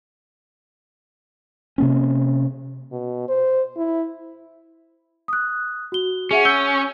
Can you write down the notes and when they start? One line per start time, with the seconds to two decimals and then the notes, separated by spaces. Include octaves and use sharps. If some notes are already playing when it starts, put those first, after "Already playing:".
1.78 C3 A#3 C#4
2.92 B2
3.28 C5
3.77 E4
5.28 D#6 F#6
5.92 F#4 G7
6.31 C#4 G#4 E5 F#5
6.45 E6 G6 G7